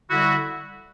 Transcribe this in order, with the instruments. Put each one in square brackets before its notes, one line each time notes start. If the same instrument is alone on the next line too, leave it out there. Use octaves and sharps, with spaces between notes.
[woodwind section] D3 G3 E4 F#4